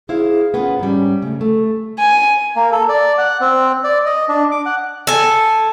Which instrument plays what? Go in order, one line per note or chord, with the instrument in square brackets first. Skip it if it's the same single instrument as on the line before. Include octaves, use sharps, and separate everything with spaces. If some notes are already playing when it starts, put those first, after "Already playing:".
[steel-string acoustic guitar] E4 C5 F5 [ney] G#4
[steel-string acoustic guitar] B3 C#4 F4
[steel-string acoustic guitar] G#2 G3 [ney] C#4
[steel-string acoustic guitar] C#3 [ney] A3
[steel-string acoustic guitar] A3 [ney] A4
[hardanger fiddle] G#5
[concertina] A#3
A4
D5
F#5
C4
D5
D#5
D4
D6
F#5
[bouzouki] A4 G#5